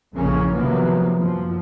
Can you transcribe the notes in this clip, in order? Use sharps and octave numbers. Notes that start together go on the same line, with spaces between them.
A#1 F2 C#3 E3 A#3 C#4
C3 D#3 F3 F#3 A#3 B3
F#2 F3